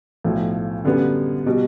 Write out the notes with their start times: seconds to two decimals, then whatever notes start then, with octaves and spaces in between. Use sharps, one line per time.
0.24 B1 A2 F3
0.84 F#2 D3 G3 B3
1.46 B2 G3